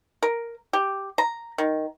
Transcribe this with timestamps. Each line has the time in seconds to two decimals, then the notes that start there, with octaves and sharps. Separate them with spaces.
0.23 A#4
0.73 G4
1.18 A#5
1.58 D#3